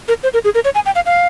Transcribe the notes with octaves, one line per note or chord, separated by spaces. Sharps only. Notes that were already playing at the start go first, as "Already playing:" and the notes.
A#4
C5
A#4
G#4
A#4
C#5
G#5
G5
F5
F5